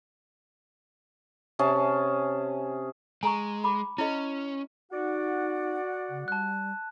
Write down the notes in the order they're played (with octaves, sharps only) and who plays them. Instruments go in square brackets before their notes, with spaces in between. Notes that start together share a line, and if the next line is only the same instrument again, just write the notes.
[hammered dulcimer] C3 C#4 G#4 A5
[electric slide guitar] G#3 [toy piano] G#5 A#5 C#6
[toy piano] B5 D6
[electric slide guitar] C#4 [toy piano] E4 D#5
[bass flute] D#4 [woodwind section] F#4 D5 F#5
[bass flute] C#3
[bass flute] G3 [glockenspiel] A5 F#6